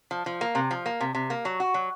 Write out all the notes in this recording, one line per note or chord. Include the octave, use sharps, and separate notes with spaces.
F3
F3
A#3
C3
F3
A#3
C3
C3
A#3
F#3
F#4
F#3